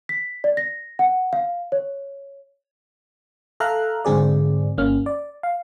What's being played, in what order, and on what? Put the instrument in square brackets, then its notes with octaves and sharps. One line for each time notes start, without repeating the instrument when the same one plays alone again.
[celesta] B6
D5
A#6
F#5
F5
C#5
[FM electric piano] A4 E5 F5 A#5 F6 F#6
G#2 D3 C4 G#4 D5
G1 A#3 C#4 F6
D5
F5